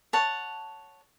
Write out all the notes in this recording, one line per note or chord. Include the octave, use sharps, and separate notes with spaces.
C#5 F#5 A5